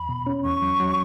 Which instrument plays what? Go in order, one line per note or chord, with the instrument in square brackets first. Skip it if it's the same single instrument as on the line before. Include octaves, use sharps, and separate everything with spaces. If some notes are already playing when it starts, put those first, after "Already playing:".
Already playing: [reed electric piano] E2 [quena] B5
[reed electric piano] B2
C#4
[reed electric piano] E2 [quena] C#6
[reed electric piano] F#3
F#3